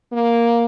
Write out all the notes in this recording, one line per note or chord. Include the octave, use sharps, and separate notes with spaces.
A#3